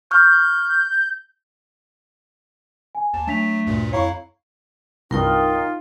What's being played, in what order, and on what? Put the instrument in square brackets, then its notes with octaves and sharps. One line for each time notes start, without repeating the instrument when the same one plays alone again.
[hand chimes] C#6 F6 [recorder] G6
[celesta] G#5
[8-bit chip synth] D#2 [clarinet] A5
[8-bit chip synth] F#3 [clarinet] A3 [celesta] D4 B6 F7
[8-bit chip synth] D2 G2 A#2
[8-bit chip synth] F2 E4 C7 [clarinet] C#5 [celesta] F5 A#5 C#6
[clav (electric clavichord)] C2 G2 [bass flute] D#4 [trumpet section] F4 [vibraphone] A#4 G5 D#6